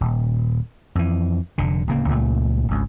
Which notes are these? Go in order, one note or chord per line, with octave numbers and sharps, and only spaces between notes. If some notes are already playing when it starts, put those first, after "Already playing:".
D#1
F2 E3
F1 D3
D1 C#3 A#3
C#2 A#2 A3
G#1 C#2